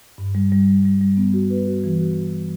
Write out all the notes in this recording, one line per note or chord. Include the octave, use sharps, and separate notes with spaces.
G2
G3
G3
G3
G3
G3
B3
F#4
B4
F#4
E3
F#4